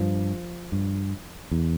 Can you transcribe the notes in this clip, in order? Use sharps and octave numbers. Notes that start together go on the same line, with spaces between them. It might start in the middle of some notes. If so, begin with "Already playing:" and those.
Already playing: G2 F3
G2
E2